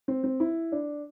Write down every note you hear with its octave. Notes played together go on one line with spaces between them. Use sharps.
C4
C4
E4
D4